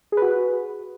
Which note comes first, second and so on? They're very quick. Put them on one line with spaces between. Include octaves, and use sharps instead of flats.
G#4 B4 F#4